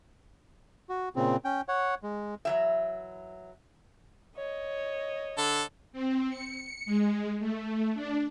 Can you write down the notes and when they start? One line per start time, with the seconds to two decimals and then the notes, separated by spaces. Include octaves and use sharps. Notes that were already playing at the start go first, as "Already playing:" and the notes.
0.89 F#4
1.16 A#2 C#3 C4
1.45 C#4 G5
1.68 C#5 F#5
2.03 G#3
2.45 E3 F#3 E5
4.37 C#5 D#5
5.38 D3 A4
5.93 C4
6.29 C#7
6.86 G#3
7.40 A3
7.94 D4